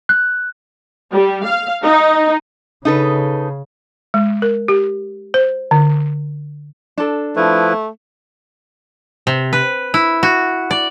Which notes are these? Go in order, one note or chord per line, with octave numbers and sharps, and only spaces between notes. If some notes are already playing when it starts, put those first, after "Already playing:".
F#6
G3
F5
D#4
C#3 D#4 A4 B4
G#3
A#4
G4
C5
D3
D4 A4
F3 A3 E4 B4
C3
B4
E4
F#4
D5